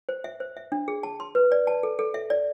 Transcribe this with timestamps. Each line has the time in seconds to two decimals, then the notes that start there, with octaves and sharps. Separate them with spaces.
0.09 C5
0.24 E5
0.40 C5
0.57 E5
0.72 D4
0.88 G#4
1.03 A5
1.20 C6
1.35 B4
1.52 D5
1.67 A5
1.83 A4
1.99 A4
2.14 E5
2.30 D5